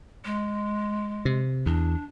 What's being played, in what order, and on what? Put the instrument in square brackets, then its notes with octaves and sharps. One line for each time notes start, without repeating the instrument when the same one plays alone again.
[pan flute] G#3
[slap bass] C3
[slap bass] E2 [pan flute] D4